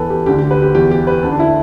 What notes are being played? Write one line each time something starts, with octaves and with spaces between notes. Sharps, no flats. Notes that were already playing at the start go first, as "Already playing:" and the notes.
Already playing: E2 E3 A4 B4
G4
D2 D3 G4
G4
B4
G4
E2 E3 G4
G4
B4
D2 D3 A4
D4
E4